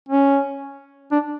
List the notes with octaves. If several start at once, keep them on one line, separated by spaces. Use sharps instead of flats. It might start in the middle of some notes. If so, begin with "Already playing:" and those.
C#4
D4